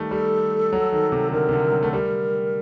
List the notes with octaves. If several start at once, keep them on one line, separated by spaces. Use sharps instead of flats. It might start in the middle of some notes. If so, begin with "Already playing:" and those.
Already playing: D#3 G3 A3
G3 A4
F#3
D#3
C3
D3 A#4
C3
D3
F#3
A3
G3 A#4